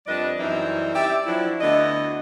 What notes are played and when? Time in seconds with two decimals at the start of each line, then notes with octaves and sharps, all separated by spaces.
0.06 F2 G3 D4 B4 D5 D#5
0.39 F#2 E3 G3 C4 D#4 E4
0.93 G4 D5 E5
1.26 F3 F#3 D4 E4
1.61 D2 D3 B3 E4 D#5